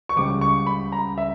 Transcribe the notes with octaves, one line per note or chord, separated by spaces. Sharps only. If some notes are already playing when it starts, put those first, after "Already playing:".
C#6
C#2 C#3 G3 D6
C#6
B5
A#5
E5